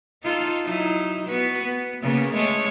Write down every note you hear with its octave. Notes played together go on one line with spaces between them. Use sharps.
D#4 F4 A4
F#3 D#4 E4
B3 F#4 B4
B3
C#3 A#3 B3
G#3 A3 C#5